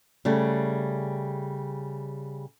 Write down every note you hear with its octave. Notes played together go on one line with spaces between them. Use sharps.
C#3 G3 A3